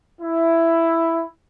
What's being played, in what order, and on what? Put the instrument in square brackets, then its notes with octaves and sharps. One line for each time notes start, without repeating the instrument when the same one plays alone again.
[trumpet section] E4